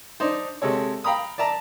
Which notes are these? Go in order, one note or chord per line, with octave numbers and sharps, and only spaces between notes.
D4 D#4 C5
C3 G#3 A4 C#5
F5 G5 A#5 B5 D#6
D5 E5 A5 A#5